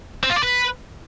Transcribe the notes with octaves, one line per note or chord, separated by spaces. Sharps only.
C4
F4
D5
B4